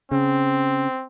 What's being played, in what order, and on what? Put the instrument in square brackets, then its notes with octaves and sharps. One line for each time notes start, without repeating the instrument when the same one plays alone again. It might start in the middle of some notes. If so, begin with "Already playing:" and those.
[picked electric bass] C#3 [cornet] C4